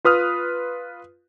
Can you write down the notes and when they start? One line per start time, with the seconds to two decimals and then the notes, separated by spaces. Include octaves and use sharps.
0.05 F4 B4 D#6 F6